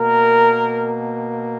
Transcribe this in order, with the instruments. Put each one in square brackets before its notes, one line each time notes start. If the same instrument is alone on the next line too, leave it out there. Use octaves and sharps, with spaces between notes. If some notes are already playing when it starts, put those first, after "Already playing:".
Already playing: [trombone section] B2 A#3 A#4